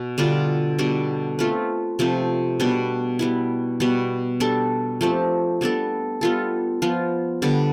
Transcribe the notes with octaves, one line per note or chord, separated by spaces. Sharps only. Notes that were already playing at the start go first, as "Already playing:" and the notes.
Already playing: B2
D3 G3 D4 F4
B2 G3 D4
A3 C4 F4 B4
C3 F3 A3 C4
B2 G3 B3 D4
G3 B3 E4
B2 G3 B3
G3 D4 A4
F3 A3 C4 G4
G3 B3 D4 A4
G3 B3 F4 A4
F3 B3 F4
D3 G3 B3